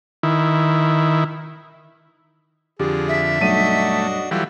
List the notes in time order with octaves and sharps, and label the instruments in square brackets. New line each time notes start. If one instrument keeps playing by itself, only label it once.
[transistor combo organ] D#3 E4
[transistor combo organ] F2 D3 [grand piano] G4 [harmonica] G#4
[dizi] E5
[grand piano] B1 G2 D#7 [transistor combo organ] A3 [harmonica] D4 F#4 D#5
[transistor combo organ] E3 F#3 G3 [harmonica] A3 F4